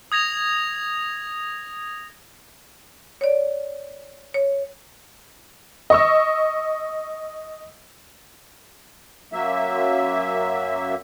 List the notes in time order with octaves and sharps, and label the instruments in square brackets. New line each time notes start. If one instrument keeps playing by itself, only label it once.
[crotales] D#6 G#6 A#6 F7
[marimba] C#5 D5
C#5
[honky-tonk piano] D#5 C#6 E6
[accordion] F#2 F#3 A#3 E5